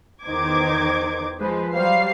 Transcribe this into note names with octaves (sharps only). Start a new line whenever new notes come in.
E2 D#3 D#4 C5 D6 G#6
F3 G#3 B4 C5
F#3 G3 C5 F5 C7